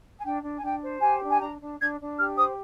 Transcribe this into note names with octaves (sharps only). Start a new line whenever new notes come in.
G#5
D4 G5
D4
G#5
D4 G5
C5
G4 G#5
D4
G#5
D4 A#5
D4
D4 G#6
D4
G4 F6
C5 D#6